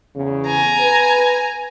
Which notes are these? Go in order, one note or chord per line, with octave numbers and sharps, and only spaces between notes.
E2 C#3
G#5 A#5
B4